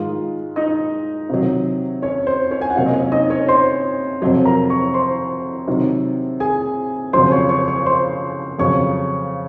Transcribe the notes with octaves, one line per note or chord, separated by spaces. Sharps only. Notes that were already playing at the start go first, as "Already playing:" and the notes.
Already playing: G#2 D#3 G#3 F4
D#4 D#5
C3 D#3 F#3
C#4 C#5
C5
C#4 C#5
G#5
F#5
C3 F#3 A#3 F5
D#5
C#4 C#5
D#4 D#5
C#4 C#5
C5 C6
F2 C3 F#3
A#4 A#5
C#5 C#6
C5 C6
C3 D#3 F#3
G#4 G#5
F2 C#3 F#3 C5 C6
C#5 C#6
C#5 C#6
C#5 C#6
C5 C6
F2 C#3 F#3 C#5 C#6